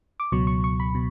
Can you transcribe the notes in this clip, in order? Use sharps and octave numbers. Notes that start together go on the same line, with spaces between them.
D6
C#2 B2 F#3 C#6
C#6
C#6
B5
B2